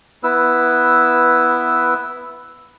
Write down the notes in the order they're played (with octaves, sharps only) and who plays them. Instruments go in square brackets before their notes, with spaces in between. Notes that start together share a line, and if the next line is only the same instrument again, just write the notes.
[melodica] B3 E4 B4 E6